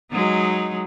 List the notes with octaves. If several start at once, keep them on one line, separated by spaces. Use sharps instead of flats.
F#3 G#3 D#4